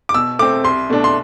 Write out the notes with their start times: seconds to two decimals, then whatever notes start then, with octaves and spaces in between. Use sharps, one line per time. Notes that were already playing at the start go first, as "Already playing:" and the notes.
0.09 D6
0.14 B2 E6
0.39 A3 C4 D6
0.64 C2 C6
0.89 B2 A3 D4
1.04 C6